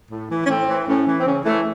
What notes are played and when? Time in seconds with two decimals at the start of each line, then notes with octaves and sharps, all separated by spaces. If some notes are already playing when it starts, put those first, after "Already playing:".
0.11 A2
0.30 E3
0.46 C#4
0.50 A2 C4
0.69 E3
0.87 A2 C#4
1.07 E3
1.20 C4
1.26 C#3 C#4
1.44 E3 A3